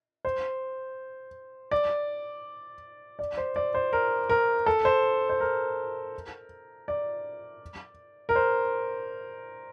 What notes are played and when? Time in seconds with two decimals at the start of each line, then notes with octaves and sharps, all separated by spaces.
0.25 C5
1.71 D5
3.19 D5
3.37 C5
3.56 D5
3.74 C5
3.93 A#4
4.29 A#4
4.66 A4
4.85 C5
5.30 C5
5.40 A#4
6.88 D5
8.29 A#4
8.36 C5